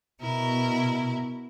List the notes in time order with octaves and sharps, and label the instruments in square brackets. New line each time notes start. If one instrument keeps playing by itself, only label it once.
[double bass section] B2 [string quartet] E4 A#4